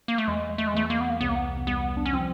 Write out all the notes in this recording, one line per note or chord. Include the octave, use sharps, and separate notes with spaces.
A#3
A3
E2 G#3
A3
G#3
E2 A3
A#3
B3
A#3
C2 B3
A#3
B3
G3 B3
D4
C#4
F3 C4